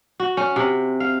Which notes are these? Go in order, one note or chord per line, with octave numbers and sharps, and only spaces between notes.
F#4
C#4
C3
F5